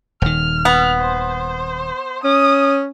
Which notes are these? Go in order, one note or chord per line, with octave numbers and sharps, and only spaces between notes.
D#1 D#3 F6
B3
C5
C#4 D#6